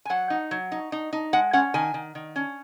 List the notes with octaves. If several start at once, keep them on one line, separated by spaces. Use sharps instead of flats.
G#5
F#3 F#5
D#4
F#3
D#4
D#4
D#4
G#3 F#5
C#4 F#5
D#3 G#5
D#3
D#3
C#4